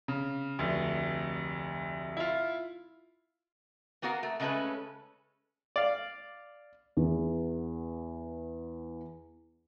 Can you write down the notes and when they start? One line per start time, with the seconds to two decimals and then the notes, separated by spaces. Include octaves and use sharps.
0.08 C#3
0.59 F1 D2
2.17 E4 F4
4.02 A#3 B3 F#4 A#4 C5 F5
4.23 A3
4.40 C#3 G#3 A3 C#4 A4 B4
5.76 D5 F5
6.97 E2 B3